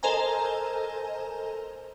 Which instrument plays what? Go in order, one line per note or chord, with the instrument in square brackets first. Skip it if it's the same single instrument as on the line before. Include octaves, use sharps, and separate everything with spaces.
[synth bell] A4 A#4 C5 D#5 G#5 A#5